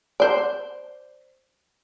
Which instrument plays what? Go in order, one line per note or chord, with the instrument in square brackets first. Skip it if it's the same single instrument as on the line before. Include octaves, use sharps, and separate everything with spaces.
[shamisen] C5 D5